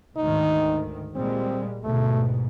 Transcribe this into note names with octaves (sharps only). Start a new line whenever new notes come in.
D2 G#2 D#3 D#4
A#2 G3 G#3 C4
D2 G#2 B2 A3